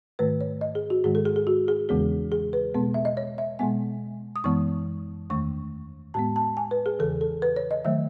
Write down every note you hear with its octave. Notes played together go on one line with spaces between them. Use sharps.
G#2 D#3 A3 B4
C#5
D#5
G#4
F#4
G#2 D#3 G#3 G#4
A4
G#4
G#4
F#4
G#4
E2 C#3 E3 G#3 B3 G#4
G#4
B4
B2 G#3 B3
E5
D#5
C#5
E5
B2 G#3 B3 G#5
D#6
F#2 E3 G#3 B3 C#6
E2 D#3 A3 C#6
A2 G#3 B3 A5
A5
G#5
B4
G#4
E2 C#3 E3 A4
A4
B4
C#5
D#5
D#3 F#3 A3 E5